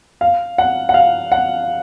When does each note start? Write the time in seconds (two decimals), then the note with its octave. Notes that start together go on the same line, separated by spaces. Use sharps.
0.21 F5
0.58 F#5
0.89 F#5
0.94 F5
1.32 F#5